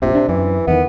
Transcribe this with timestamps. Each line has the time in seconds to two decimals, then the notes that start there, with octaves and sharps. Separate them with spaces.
0.02 F1 A#1 C3 F3
0.15 D4
0.29 F#2 E3
0.67 E2 D#3 B3